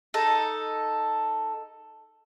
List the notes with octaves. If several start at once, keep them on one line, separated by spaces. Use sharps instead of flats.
D#4 A4